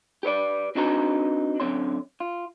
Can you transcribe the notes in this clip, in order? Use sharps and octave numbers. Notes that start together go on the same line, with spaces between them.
G4 B4 C#5 D5
C4 D4 D#4 F#4 B4 A#5
F#2 D3 A3 C4 C#5 C6
F4